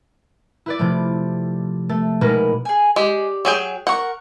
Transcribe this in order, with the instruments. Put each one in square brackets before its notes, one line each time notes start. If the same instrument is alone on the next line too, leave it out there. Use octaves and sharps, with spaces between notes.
[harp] E4 B4 D5
C3 F3 A3
A3
B2 G#3 A#3 D#4 B4
[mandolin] G#4 G#5
[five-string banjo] G#3 [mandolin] G4 D5
[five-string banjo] F#3 G#4 G5
[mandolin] A#4 C#6 [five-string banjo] F#5